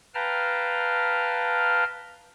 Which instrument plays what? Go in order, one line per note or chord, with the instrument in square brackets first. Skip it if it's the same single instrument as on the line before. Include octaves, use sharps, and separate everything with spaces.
[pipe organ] B4 F5 G5 A5 A#5 F6